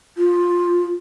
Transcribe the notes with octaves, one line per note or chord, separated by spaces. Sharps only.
F4